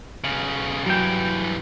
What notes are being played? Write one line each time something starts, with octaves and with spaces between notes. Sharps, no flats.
B1 C#3
G2 E3 F#3 G5